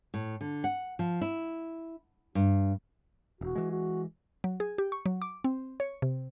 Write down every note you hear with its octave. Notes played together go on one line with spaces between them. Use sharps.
A2
D3
F#5
F3
E4
G2
E1 F#4
E3 G#3
F#4
F#3
G#4
G4
C#6
F#3
D6
C4
C#5
C3